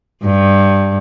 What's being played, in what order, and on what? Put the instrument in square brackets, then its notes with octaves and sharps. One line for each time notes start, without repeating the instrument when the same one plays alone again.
[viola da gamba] G2